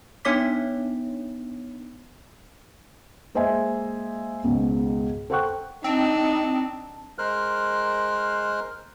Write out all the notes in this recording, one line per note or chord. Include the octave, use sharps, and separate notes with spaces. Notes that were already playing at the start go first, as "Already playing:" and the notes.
B3 D4 D#4 C#5 D6 B6
G#3 A#3 C5 D#5 E5 G#5
C#2 G#2 B2
A4 C5 F#5 G5 C#6 F#6
C4 D4 D#4
G#3 A#4 C5 F6 F#6